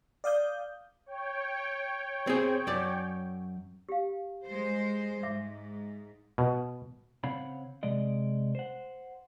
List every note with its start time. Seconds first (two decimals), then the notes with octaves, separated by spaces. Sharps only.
0.24 D5 F5 D#6 G6
1.06 C#5 G5
2.27 C4 G#4
2.67 F#2 D5
3.89 G4 F5
4.46 G#3 C5
5.23 G#2 E5 D6
6.38 B2
7.24 C#3 C4 C#5 F5 F#5 B5
7.83 C3 G#3 D5 D#5
8.55 C5 F#5